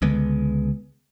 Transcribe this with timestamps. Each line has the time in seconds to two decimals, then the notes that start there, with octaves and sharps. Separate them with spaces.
0.02 C#2 D3 G#3 B3